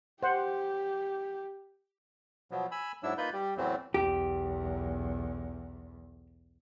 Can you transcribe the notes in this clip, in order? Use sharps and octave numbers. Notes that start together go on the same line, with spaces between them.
G4 C5 F#5
B2 F3 F#3 B3
G#5 B5 E6
G#2 F#3 D4 E4 E6
A#3 D#4 F4 B4 B5 G6
G3 G4
E2 A2 E3 F#3 A3 C4
B1 E2 G4